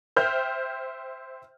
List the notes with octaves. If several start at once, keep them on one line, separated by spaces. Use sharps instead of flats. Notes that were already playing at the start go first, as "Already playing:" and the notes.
C5 E5 G5 F6 G6